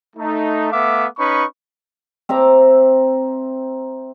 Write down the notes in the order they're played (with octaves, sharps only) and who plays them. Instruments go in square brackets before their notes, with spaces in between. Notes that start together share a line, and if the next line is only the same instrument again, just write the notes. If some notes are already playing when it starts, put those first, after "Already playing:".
[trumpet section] A3 D#4
A3 B3 E5 F5 D6
C#4 D#4 B4 B5 C#6
[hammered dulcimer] C4 E5 A#5 D6